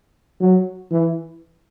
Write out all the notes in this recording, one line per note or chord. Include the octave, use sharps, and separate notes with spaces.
F#3
E3